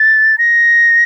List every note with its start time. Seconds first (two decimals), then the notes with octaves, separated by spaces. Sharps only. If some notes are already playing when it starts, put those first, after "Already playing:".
Already playing: A6
0.38 A#6